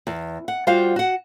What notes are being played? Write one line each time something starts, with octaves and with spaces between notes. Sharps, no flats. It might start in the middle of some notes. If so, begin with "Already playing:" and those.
E2
F#5
G3 F4 F#4 C5 F5
F#4 F#5